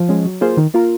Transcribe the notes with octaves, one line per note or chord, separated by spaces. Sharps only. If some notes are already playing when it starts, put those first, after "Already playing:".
Already playing: F3
G#3 C#4
F#3
A#3 F4 G#4 C5
D#3
A#3 F4 A#4